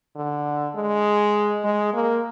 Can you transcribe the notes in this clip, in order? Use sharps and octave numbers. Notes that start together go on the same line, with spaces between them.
D3
G#3
G#3
A#3